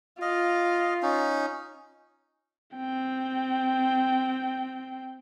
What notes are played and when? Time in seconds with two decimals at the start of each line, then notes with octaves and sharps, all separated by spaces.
0.22 F4 D#5 F5
1.02 C#4 D#4
2.76 C4 G5